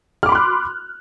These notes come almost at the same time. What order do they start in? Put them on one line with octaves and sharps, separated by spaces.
F6 D6 B5 C6 F#6